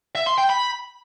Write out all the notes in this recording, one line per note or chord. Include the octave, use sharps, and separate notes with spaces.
E5
C6
G5
B5